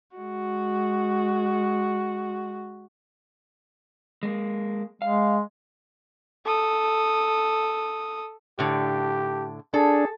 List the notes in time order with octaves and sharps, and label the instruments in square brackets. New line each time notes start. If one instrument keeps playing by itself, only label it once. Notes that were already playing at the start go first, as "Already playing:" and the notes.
[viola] G#3 F#4
[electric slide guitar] G#3 A#3
[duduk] G#3 [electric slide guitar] F5
[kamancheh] A4 D#6
[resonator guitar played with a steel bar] A2 D3 [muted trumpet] G4
[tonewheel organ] D4 [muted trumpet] G#4 [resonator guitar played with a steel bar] A4